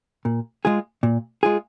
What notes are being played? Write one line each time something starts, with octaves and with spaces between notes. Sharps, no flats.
A#2
G#3 F4 G#4
A#2
G#3 F4 G#4